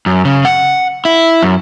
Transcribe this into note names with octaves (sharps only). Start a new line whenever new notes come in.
F#2
C#3
F#5
E4
F#2